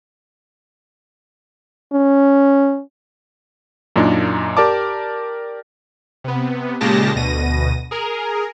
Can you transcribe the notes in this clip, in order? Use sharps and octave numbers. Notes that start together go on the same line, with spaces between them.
C#4
F#2 A#2 A#3 D4 D#4
G4 A#4 D5 A5 D6
C3 B3
A#2 C#3 G#3 G4 A5 A#6
D2 B2 A#6 D#7
G#4 A#4